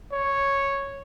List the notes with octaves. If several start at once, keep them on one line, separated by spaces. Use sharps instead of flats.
C#5